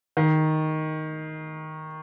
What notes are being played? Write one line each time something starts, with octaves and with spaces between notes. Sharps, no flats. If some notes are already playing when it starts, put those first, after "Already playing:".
D#3